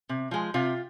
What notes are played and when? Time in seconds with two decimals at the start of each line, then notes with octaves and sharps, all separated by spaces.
0.09 C3
0.31 F3 G#3
0.54 C3 F4